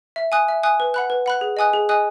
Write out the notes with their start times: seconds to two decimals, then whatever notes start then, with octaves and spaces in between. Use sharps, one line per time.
0.16 E5
0.32 G#5 D#6 F#6
0.48 E5
0.63 G#5 D#6 F#6
0.80 B4
0.94 F#5 B5 F#6
1.10 B4
1.26 F#5 B5 F#6
1.41 G#4
1.57 D#5 G#5 D#6 F#6
1.73 G#4
1.89 D#5 G#5 D#6 F#6